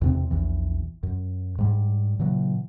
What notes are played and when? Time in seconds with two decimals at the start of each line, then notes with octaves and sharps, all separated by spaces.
0.01 E2 C3 C4
0.31 A#1 E2 E3
1.03 F#2
1.58 G#2 G3
2.19 A#2 C#3 E3 F#3